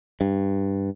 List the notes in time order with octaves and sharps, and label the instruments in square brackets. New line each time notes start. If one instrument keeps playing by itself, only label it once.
[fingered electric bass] G2